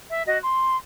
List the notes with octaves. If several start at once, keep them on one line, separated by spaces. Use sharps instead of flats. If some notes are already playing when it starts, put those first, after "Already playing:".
E5
F#4 D#5
C6